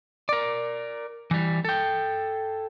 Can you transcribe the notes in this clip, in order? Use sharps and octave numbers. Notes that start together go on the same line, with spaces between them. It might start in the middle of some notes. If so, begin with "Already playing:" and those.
A#4 D5
E3 G3
A4 G5